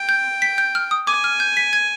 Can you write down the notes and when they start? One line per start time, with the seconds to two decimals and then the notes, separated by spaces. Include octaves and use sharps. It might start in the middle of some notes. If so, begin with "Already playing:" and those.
Already playing: G5
0.09 G6
0.42 B6
0.58 G6
0.75 F6
0.91 D#6
1.07 G#5 D6
1.24 F6
1.40 G6
1.57 B6
1.73 G#6